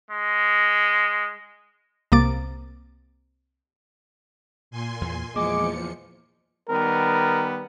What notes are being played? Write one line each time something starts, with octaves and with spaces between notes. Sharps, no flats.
G#3
C2 C3 A#3 D6 A6
A#2 G#5 C6
E2
E2 F3 G#3 A#3 D6 C#7
D#3 G3 B3 A#4